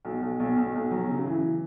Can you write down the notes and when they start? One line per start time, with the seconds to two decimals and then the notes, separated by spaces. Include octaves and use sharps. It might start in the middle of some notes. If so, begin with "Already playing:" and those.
0.05 B1
0.22 B1
0.40 B1
0.56 B1
0.75 B1
0.91 F#3
1.09 C#3
1.26 E3